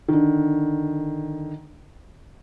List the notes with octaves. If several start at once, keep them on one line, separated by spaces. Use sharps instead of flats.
D3 D#3